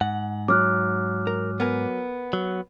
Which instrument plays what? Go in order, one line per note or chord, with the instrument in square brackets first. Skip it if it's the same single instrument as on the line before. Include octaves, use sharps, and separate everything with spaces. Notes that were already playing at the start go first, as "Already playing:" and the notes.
[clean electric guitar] G#2 F#5
[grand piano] F#3 [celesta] D6 F6 F#6
[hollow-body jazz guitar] A#4
B3 A#4 G#5
[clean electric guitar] F#3